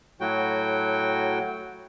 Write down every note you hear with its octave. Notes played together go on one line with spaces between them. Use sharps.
A2 F#3 F#4 G5